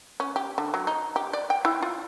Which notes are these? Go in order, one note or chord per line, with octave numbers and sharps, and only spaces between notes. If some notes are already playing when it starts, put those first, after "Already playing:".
C#4
G4
D3
F#3
D#4
G4
D5
G5
E4
F4